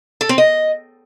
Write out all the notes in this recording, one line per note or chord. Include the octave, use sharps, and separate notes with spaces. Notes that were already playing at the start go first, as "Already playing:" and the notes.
A4
C4
D#5